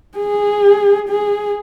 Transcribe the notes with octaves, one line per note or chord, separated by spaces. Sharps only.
G#4
G#4